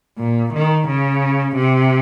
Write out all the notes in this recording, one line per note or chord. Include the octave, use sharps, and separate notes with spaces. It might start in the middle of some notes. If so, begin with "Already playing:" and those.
A#2
D#3
C#3
C3